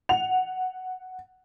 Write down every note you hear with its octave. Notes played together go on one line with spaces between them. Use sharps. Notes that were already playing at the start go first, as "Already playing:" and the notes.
F#5 F7